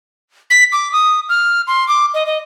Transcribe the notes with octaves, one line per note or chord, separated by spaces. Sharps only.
B6
D6
D#6
F6
C6
D6
D#5
D#5